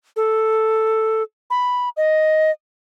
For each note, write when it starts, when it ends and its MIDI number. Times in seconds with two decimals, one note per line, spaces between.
0.16 1.23 69
1.50 1.89 83
1.97 2.51 75